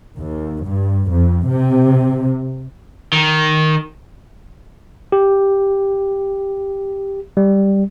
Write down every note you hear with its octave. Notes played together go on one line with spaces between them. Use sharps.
D#2
G2
F2
C3
D#3
G4
G3